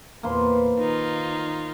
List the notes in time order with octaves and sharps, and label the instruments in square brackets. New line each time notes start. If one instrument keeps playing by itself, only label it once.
[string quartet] E2 A#2 [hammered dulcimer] A#3 B4 C5
[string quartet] D#3 D#4 F4